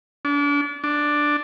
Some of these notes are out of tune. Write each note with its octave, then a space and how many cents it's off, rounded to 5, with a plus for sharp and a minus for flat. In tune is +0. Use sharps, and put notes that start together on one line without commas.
D4 -35
D4 +5